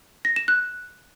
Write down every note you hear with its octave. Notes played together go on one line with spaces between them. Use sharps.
A#6
E7
F#6